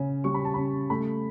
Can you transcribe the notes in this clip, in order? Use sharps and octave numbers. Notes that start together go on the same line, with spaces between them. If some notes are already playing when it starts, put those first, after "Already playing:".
Already playing: C#3 C#4
G3 C#6
B5
A5
C#3 B5
A3 B5